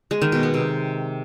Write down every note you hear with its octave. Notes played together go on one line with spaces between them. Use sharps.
G#3
D#3
B2
B3
C3